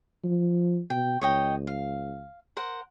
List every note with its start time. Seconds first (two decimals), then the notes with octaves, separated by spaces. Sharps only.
0.24 F3
0.90 B2 G5
1.21 C#2 C#5 D#5 G5
1.67 F5
2.57 A#4 C5 F#5